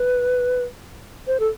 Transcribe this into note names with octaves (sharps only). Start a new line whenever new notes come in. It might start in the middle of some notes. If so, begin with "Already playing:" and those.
Already playing: B4
C5
A4